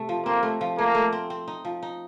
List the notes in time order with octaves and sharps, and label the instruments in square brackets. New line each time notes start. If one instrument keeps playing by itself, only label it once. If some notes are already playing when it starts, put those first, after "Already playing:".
Already playing: [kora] C3 A3
F3
[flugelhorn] A#3 [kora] C4
[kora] A3
F3
[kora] A3 [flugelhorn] A#3
[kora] A3
C4
C4
D#4
F3
D#4